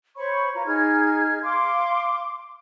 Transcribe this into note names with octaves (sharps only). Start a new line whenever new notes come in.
C5 C#5 B5 C#6
F4 B4 A#5
D#4 G#4 F6 G#6
F5 C6 D6